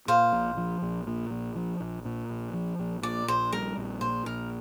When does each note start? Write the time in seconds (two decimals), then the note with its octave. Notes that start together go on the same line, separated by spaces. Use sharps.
0.08 A#2 C5 F5
0.33 A#1
0.57 F3
0.82 A#1
1.07 A#2
1.31 A#1
1.55 F3
1.80 A#1
2.05 A#2
2.30 A#1
2.53 F3
2.79 A#1
3.03 A#2 D5
3.28 A#1 C5
3.53 G3 A#4
3.77 A#1
4.01 A#2 C5
4.26 A#1 A#4